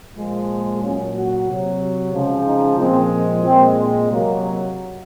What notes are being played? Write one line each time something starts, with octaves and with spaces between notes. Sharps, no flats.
A#2 F3 G#3
A#2 F#3 C#4
F#4
C3 F#3
C#3 F3 G#3
D#4
A#2 F3 G#3 C4
A#2 G#3 C4
C3 F#3 A#3